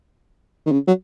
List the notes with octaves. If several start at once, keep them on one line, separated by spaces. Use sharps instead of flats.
D#3
C#3
F#3